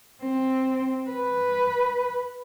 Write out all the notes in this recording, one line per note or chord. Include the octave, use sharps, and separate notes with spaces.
C4
B4